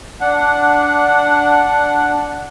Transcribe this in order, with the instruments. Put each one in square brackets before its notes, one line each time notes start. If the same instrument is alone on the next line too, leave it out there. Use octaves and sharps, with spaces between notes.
[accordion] D4 F#5